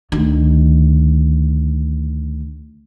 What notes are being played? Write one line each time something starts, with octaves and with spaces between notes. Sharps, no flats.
D2 D#3